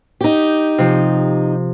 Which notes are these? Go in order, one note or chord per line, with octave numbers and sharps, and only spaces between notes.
D#4 G4
C3 F3